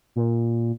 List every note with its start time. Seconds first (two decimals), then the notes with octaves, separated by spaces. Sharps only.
0.16 A#2